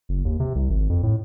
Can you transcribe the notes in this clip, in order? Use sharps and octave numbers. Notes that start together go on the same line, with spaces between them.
F#1
D#2
C3
C2
G#1
F2
A2